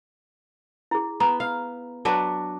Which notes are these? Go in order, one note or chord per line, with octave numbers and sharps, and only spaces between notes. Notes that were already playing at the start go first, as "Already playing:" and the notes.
E4 G#4
B3 A#5
F5
F#3 D4 B4